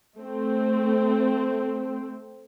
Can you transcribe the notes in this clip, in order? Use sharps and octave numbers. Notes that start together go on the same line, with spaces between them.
A3 C4